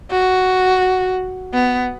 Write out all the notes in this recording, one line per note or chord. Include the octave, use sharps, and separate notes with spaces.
F#4
B3